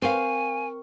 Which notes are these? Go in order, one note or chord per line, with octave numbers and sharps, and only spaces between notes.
C4 A#4 C5 F5 G#5 C#6